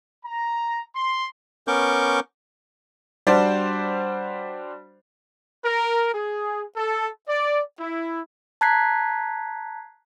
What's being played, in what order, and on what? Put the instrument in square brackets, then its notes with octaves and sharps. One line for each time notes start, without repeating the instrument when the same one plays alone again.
[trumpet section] A#5
C6
[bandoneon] B3 C#4 A#4 C#6 D6 G6
[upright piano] G3 D4 F#4 C5 D5
[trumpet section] A#4
G#4
A4
D5
E4
[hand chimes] A5 A#5 F#6 G#6 B6 C7